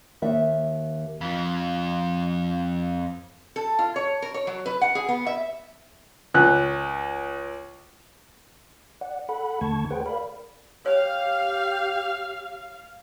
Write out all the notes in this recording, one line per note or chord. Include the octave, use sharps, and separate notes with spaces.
D#2 E5
F2 F3
A4
F4
C#5
A#4
C#5
F#3
B4
F#5
G#4
B3
E5
C#2 F#6
D5 F#5
A4 F#5 B5
D#2 D3 A3 A5 C#6 G#6
G#4 B4 C5 F#5 G5
A#4 D5 F5 B5
G4 C#5 F5